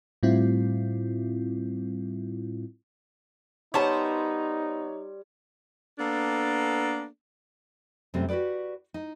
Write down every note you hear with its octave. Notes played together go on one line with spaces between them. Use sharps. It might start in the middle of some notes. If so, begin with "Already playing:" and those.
A2 G3 C4 E4 F4
G3 B3 D#4 C5 C#5 A5
A#3 B3 D4 A4
F#2 C3 G3 A3 C4
F#4 G4 A4 B4 D5
D#4